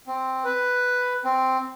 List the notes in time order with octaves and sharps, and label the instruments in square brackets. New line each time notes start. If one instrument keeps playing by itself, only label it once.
[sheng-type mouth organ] C4
B4
C4